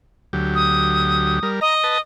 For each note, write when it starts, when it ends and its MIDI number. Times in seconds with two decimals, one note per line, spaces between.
0.33 1.39 38
0.33 1.39 54
0.33 1.39 67
0.55 1.49 87
1.43 1.60 55
1.43 1.60 70
1.61 2.00 75
1.61 1.75 82
1.84 1.98 71
1.84 1.98 81